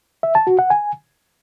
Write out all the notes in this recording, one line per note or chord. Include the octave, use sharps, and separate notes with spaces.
E5
A5
F#4
F#5
G#5